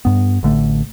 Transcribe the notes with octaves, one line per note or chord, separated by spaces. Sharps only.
G2 B3
A1 D3 A3